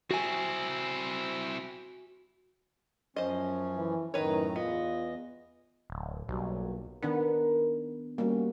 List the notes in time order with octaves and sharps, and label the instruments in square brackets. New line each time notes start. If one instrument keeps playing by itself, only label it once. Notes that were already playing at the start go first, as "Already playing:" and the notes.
[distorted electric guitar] C4 E4 [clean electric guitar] F#4 G#5
[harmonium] F#2 F3 C#4 [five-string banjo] C5 D#5
[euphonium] E3
[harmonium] F#2 A2 A#5 [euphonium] D#3 [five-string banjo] B4 C#5
[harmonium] E2 D#5 [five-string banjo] B3 [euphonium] F4
[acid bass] D1
[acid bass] B1 [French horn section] G2 A#2 F#3
[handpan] D#3 D4 B4 [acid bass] B3 [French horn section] A#4
[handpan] G3 A#3 [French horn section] C#4 F#4